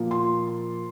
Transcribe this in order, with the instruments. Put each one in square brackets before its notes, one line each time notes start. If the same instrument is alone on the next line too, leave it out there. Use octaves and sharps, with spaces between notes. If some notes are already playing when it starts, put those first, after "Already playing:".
Already playing: [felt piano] A#2 F3 A#3
C6